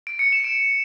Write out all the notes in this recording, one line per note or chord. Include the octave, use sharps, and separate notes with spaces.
D7
C#7
E7
D7